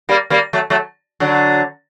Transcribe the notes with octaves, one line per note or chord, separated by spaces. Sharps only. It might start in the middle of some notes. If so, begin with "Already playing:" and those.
G3 A#3
G3 A#3
F#3 A3
F#3 A3
D3 F#3